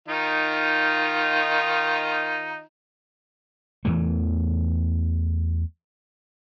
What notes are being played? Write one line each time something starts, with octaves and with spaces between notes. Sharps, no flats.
D#3 D#4 F4
E2 E3 A3